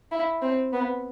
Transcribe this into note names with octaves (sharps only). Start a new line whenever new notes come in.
E4
C4
B3